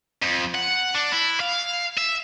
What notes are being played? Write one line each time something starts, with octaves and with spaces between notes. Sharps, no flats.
F2
F#5
D4
E4
F5
E5